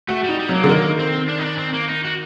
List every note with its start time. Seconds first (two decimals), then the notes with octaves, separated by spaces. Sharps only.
0.08 A3 F#4
0.24 G3 D#4
0.39 G3
0.49 F#3
0.54 A#3
0.64 D3
0.68 D#3 A#3
0.99 C4
1.29 D4
1.39 D#4
1.44 D4
1.59 C4
1.74 A#3
1.89 D#4
2.05 F#4